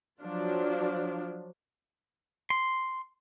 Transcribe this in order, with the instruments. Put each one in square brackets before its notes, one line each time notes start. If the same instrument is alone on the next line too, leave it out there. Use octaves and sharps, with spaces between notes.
[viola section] F3 F#3 D4 F4
[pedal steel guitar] C6